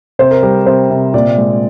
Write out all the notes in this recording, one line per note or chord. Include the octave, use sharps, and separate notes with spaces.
C3 C5
A#4
G3 A#4
C3 C5
C3
A#2 D5
G#3